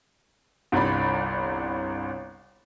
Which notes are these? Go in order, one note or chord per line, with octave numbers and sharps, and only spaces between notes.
G1 C2 D4 D5 B5